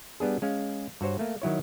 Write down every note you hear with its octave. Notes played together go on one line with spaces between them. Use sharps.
G3 B3 D4 G#4
G#3 C#4 F5
G2 F#4 C5 C#5
A3 A#3
D#3 F#3 E4 C#5